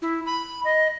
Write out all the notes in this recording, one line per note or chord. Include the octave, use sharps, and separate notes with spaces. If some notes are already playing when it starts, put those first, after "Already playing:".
E4
B5
D#5